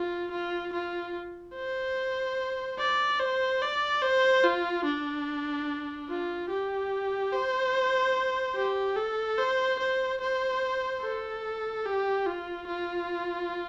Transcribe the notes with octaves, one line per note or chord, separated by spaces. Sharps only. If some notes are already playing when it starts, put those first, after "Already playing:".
Already playing: F4
F4
F4
C5
D5
C5
D5
C5
F4
D4
F4
G4
C5
G4
A4
C5
C5
C5
A4
G4
F4
F4